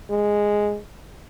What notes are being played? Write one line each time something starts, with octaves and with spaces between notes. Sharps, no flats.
G#3